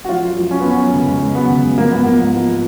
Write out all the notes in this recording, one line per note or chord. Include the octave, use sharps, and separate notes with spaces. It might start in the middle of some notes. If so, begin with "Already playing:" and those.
F#4
F3 F4
F#2
F3
F#2 C#4
B3
F3 C#4
F#2
C#3
C#2
C#2
F#3 B3
C#3
C#2
F3 A#3
G#2 B3
F3 A#3
G#2
F3